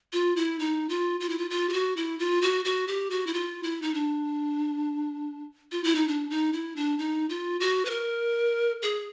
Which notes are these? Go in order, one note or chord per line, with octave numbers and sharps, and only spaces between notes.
F4
E4
D#4
F4
F4
E4
F4
F4
G4
F#4
E4
F4
F#4
F#4
G4
F#4
E4
F4
E4
D#4
D4
F4
E4
D#4
D4
D#4
E4
D4
D#4
F4
F#4
B4
A#4
G#4